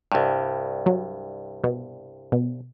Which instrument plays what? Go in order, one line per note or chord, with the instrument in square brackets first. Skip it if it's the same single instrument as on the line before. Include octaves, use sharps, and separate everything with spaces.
[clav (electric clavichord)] C2 G2
[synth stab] F#3
B2
B2